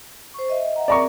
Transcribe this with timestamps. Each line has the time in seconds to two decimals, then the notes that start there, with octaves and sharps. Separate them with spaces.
0.34 C5 C#6
0.49 D#5 E5
0.64 D#5
0.76 E5 F#5 A#5
0.88 C4 G#4 A#4 D5 A#5 C#6